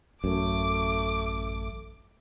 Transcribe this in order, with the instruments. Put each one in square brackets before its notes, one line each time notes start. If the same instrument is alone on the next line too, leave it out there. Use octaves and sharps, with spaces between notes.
[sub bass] A1 [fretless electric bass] F#2 [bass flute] A3 [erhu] D6